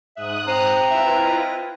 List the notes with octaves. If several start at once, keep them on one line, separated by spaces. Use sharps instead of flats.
G#2 E5 D#6 F#6
C4 C5 A#5
E4 F4 B4 E5
D#5